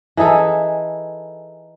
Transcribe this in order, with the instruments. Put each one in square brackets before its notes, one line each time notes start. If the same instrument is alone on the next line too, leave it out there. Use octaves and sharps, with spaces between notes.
[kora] E3 D#4 G#4 A4